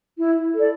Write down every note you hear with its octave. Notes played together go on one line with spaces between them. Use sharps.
E4
A4 D5